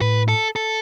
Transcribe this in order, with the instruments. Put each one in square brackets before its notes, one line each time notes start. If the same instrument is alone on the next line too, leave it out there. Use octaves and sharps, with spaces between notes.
[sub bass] A2 [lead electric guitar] B4
[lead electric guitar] A4
A4